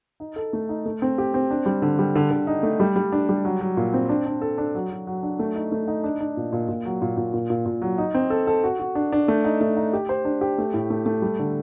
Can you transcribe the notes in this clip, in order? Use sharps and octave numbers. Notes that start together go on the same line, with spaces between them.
D#4
A4
A3
D#4
A3
C4
G4
C4
D4
G3
D3
G3
D3
D3
D#4
A3
G3
G3
D4
G3
F#3
F#3
A#2
C4
D4
D4
A4
D4
F#3
F#3
F#3
D4
A3
D#4
A3
D#4
D4
D4
A#2
A#2
A#2
F#3
A#2
A#2
A#2
A#2
A#2
F#3
D#4
C4
A4
A4
F#4
F#4
D4
D4
A3
D#4
A3
D#4
G4
C5
D4
G4
A3
A2
A3
A3
G3
D3